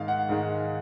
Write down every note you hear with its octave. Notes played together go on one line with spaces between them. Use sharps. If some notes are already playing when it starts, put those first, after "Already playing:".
Already playing: G#2 D#3 G#3 F5
F#5
G#2 D#3 G#3